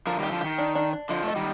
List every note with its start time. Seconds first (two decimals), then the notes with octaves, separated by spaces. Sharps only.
0.07 D3 F3 A#4
0.19 D#3 G3 G4
0.31 D3 F3
0.41 D#3 G4
0.58 D4
0.75 D4
0.93 D4
1.09 D3 F3 D#5
1.23 A3 D#5
1.36 D#3 G3